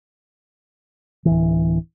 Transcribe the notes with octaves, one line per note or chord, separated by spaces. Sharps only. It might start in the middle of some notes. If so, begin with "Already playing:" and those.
D1 G1 E3